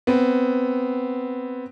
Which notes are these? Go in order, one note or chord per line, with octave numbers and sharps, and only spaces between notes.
B3 C4